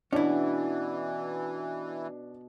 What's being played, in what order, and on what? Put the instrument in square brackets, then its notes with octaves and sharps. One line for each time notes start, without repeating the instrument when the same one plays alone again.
[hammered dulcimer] B2 [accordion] E3 [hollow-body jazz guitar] C#4 E4 [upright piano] D4